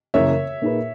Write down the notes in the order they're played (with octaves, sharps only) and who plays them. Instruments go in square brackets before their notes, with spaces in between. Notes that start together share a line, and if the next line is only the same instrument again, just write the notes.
[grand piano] F#2 C#3 E3 A#3 C#4 [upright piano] C#5 E5
[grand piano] A#2 A#3 D#4 G#4 B4